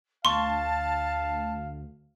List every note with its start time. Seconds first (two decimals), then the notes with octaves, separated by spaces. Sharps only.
0.25 D2 F5 A5 C6 C#6